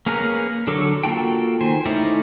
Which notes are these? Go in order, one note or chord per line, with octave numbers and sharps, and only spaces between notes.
A#3 C#4 G#4 A#4 B4
D3 F#3 A4 C#5 D6
A#3 F4 F#4 A4 G5
D#3 C5 G#5
A3 C#4 D#4 E4 D5